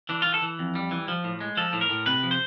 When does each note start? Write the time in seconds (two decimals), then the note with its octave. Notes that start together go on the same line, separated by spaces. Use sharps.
0.09 E3 D4
0.22 E3 F4
0.34 A4
0.42 E3
0.59 F2
0.75 G3
0.91 E3
1.08 F3
1.24 A2
1.41 G#3
1.57 F3 A4
1.73 A2
1.81 A#4
1.90 A2
2.06 C3 B4
2.23 F3
2.31 C5